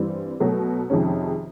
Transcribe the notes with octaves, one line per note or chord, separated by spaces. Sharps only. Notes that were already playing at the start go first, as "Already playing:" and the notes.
Already playing: G2 E3 G3 C4
B2 F#3 A3
F2 C3 D#3 G#3 C#4